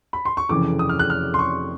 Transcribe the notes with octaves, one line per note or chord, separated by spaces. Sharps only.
B5
C6
C#6
F1 F2 C#3 E3 D6
D#6
F6
F#6
F6
C6
C#6